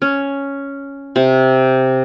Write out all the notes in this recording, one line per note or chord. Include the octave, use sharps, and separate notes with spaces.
C#4
C3